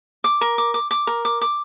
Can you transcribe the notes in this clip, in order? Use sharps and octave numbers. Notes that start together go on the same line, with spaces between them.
D6
A#4
D6
D6
D6
A#4
D6
D6